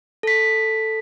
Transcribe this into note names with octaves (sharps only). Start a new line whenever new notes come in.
A4 B6